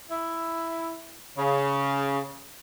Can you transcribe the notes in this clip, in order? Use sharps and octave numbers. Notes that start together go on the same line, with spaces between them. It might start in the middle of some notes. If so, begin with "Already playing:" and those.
E4
C#3